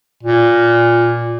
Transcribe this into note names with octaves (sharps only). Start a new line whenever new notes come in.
A#2